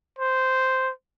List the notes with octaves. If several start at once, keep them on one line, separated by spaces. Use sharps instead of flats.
C5